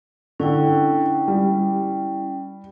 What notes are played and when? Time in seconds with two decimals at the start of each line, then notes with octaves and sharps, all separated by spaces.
0.40 D3 C#4 E4 G5
1.28 G3